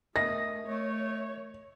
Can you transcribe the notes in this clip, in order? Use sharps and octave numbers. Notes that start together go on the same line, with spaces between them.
A3 A#4 D#5 E5 D#6 A#6
A3 C#5